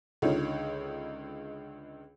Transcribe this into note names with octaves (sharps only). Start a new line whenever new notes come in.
C#2 D3 D#4 F4 C#5